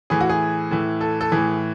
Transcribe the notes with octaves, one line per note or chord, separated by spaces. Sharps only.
A2 E3 G#4
F#4
G#4
A2 E3
A4
A4
A2 E3 G#4